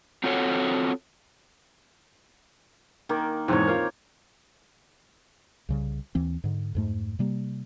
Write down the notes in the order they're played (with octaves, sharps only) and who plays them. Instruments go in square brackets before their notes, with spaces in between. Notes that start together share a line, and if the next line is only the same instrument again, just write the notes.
[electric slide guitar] C4 F4 F#4 A4 C#5
[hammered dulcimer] D#3 A#3
[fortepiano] E2 G#2 [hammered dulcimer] C4 C#5
[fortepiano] F4 A#4
[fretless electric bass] C2 C#3 G3
D#2 E3 C4
G#2 D3
F2 G#2 A3
C3 G3 A#3